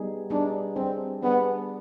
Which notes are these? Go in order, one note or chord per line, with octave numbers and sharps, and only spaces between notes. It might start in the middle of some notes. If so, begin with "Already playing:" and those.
Already playing: G3 B3 D#4 G#4
G3 B3 D4 D#4 G#4
G3 C4 D4 G#4
G3 B3 D4 G#4